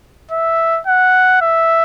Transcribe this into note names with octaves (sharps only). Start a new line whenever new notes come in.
E5
F#5
E5